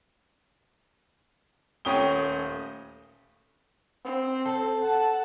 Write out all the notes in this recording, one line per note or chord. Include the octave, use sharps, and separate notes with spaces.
D#1 A3 C#4 G5 D#6 G7
C4
A4
F#5 A5